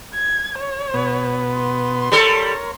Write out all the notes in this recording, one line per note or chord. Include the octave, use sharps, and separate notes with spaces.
G#6
C#5
B2 B3
C6
G3 A4 A#4 C#5